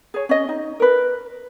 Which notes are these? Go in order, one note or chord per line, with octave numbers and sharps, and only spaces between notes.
G#4 C#5
C#4 D#5
D#4
A#4 B4